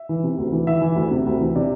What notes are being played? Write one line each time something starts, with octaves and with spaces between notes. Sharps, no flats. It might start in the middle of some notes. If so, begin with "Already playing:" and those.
Already playing: E5
E3
C3
D2
E3
E3 E5
E3
D2
C3
D2
E3
C3 D5